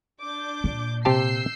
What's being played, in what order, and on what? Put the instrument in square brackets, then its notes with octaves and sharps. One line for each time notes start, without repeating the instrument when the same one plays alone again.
[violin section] D4 D6 G6
[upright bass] A#2
[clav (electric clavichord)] C3 G4 A5 [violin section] E6 G6 C7